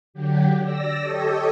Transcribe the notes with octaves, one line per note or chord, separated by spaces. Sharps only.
D3 F#3 G4
D5 E6 A#6
G4 A4 C#5 D#5